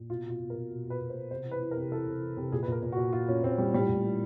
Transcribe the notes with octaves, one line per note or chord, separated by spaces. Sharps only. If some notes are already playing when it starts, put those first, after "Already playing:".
Already playing: A#2
B2 F4
B2
F4
B2
A#4
B2
B2
B2
B4
B2
C5
B2
C3 C5
E3
B4
E3
A#4
C3
E3 A4
C3
E3
C3
A#2 G#4
B4
A#2 A#4
A#2
F#4
A#2
A#2 F4
A#2 C#4
A#2 C4
A#2 G3
A2 G3
A2
E3